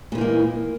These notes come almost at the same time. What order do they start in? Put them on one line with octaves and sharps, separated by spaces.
A#2 E3 D#4 A#3